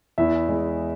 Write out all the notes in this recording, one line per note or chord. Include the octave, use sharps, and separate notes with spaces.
E2 E4 E5
G#3